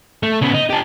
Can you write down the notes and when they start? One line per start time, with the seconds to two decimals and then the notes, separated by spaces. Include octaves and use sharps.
0.23 A3
0.41 C#3 B3
0.54 D#4
0.70 G4 A4